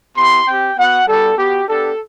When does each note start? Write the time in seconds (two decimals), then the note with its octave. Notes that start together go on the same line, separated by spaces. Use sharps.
0.16 B3 E4 G4 C6
0.46 C4 G4 G5
0.77 B3 F#4 F#5
1.07 G3 B3 D4 F#4 A4
1.37 B3 F#4 G4
1.68 B3 D4 G4 A4